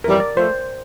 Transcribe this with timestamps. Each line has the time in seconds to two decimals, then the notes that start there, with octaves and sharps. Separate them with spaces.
0.04 F2 E3 G3 A#4
0.20 D5
0.36 F3 A3 C5